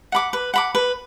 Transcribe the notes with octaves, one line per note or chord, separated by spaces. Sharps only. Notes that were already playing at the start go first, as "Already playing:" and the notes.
F#5 B5 D6
B4
F#5 B5 D6
B4